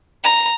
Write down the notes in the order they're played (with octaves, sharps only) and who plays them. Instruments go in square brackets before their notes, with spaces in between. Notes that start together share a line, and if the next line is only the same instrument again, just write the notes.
[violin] A#5